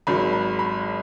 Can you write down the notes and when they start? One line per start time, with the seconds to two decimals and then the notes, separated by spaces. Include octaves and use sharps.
0.07 G#1 G#2 F#3 B5
0.33 B5
0.59 B5